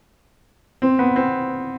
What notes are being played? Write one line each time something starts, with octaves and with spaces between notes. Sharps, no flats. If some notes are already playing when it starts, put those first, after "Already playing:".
C4
B3
C4